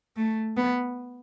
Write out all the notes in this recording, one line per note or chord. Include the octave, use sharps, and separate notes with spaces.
A3
B3